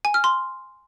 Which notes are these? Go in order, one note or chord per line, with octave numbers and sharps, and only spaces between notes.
G#5
F6
C6